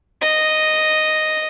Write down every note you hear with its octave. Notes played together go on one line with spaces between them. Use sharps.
D#5